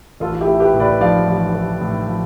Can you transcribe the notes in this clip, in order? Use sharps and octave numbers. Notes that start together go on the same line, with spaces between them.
A1 F4 A4
E4 G4
A3
G4 B4
A2
B4 D5
F3 D5 F5
A1
A3
A2
F3